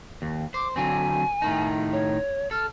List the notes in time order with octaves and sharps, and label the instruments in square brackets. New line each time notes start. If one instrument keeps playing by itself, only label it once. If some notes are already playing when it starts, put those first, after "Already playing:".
[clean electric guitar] D#2
[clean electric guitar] C5 [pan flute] D6
[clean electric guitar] D3 F#3 C4 [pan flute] G#5
[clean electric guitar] A2 D#3 D#4
[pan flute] C#5
[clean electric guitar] A4 [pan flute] F6